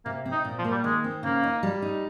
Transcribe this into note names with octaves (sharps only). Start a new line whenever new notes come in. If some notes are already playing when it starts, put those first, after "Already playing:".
C3 A#3
C4
D#4
A#2
F3
A#3
G3
D#3 G#3
C4
C#3 A#3
D#4
G3
D#4